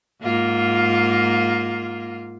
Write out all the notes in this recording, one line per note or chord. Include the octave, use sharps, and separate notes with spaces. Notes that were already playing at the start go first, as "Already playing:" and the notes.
G#2 A#3 F4